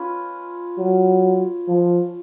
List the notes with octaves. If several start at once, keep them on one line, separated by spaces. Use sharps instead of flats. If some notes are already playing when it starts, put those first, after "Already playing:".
Already playing: C#4 F4 B4
F#3
F3